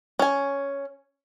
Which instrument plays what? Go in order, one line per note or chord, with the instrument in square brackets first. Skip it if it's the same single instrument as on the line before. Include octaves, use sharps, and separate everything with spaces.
[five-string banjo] C#4 G#5